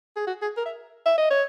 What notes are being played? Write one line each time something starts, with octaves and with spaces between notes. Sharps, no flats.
G#4
F#4
G#4
A#4
E5
E5
D#5
C#5